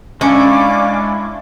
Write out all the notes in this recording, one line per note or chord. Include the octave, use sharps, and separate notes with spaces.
G#3 C#4 D4 E4 D5 F5 D6